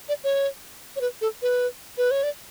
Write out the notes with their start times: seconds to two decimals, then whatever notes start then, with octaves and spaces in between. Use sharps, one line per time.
0.09 D5
0.24 C#5
0.96 C#5
1.01 B4
1.21 A4
1.42 B4
1.97 B4
2.11 C#5
2.23 D5